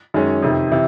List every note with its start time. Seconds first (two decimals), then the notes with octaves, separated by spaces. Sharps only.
0.14 F#2 D#3 G#3 C#4
0.42 F2 C3 D#3
0.72 C3 E3